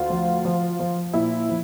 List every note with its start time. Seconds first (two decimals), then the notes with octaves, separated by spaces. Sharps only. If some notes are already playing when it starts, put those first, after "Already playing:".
Already playing: D2 F4
0.10 F3
0.45 F3
0.79 F3
1.13 A#2 E4
1.49 F3